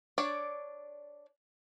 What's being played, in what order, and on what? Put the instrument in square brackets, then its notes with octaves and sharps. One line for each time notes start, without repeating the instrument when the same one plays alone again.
[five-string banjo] D4 C#5 D5